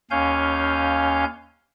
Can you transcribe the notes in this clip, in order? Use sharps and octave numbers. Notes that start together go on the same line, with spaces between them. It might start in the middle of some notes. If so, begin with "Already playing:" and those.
D#2 C#4 C#5 F5 G#5 G6